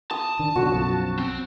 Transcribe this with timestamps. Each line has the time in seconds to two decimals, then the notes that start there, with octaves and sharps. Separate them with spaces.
0.11 A5 D#6
0.39 D#3 D4
0.56 B2 D3 F#3 F#4
0.69 B1 F#2 F3
1.19 C4